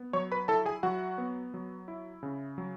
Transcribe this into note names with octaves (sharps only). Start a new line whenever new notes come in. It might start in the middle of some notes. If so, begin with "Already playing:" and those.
Already playing: B3
F#3 C#5 C#6
B4 B5
E4 A4 A5
G#4 G#5
F#3 F#4 F#5
B3
F#3
E4
C#3
F#3